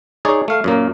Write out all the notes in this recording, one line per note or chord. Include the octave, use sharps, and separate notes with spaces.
D#4 G#4 C#5 D5
A3 F5
F#2 A#2 A#3